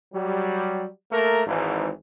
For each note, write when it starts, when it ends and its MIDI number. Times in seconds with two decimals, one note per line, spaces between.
0.14 0.86 54
0.14 0.86 55
1.12 1.42 57
1.12 1.42 58
1.12 1.42 70
1.47 1.89 32
1.47 1.89 44
1.47 1.89 52